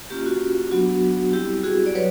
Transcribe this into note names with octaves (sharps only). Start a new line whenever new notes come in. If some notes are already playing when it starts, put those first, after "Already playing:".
A#3 C#4 F4 G4
F#4
F#3 B3 D4 F#4
G3 C4 E4 G4
F#4 G#4
D5
F#3 B4 C#5